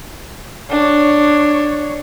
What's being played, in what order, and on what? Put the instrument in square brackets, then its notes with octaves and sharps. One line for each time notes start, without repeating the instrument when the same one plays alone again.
[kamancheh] D4 C#5